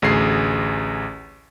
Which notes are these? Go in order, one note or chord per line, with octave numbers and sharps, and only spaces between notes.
A1 D2 G#4 C7